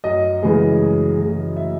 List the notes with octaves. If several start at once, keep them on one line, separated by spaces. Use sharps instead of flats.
F#2 D#5
C#3 E3 G#3
F#2
C#3 E3 G#3
E5